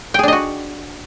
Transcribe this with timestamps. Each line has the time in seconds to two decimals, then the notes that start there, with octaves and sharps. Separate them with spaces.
0.14 G5
0.19 G#4
0.23 D4
0.28 D#5
0.33 F#4